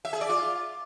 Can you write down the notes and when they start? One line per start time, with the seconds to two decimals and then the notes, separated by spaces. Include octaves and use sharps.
0.05 E5
0.13 G#4
0.21 D5
0.29 F4